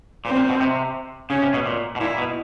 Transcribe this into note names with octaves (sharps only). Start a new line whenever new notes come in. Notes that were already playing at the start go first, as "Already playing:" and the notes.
A#2 C4
A#2
B2
C3
C#3 C#4
C3
B2
A#2
B2
A#2 E4
B2